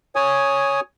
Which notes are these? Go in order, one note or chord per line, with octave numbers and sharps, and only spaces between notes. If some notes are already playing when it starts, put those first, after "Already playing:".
C#5 G#5 D#6